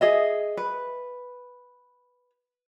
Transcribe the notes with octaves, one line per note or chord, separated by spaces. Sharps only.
G#4 D#5 E5
B4